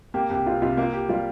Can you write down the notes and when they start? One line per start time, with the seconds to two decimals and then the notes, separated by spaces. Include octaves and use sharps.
0.14 A#3 G4
0.30 C2 G4
0.46 C3 F4
0.62 C2 F4
0.77 A#3 F4
0.93 G4
1.09 G3 F4